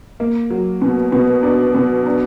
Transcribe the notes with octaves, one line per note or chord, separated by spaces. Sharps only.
A#3
F#3
B2
B2
D4
B2
D4